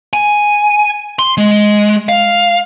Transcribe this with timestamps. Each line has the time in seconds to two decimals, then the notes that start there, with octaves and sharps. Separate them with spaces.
0.13 G#5
1.19 C6
1.37 G#3
2.09 F5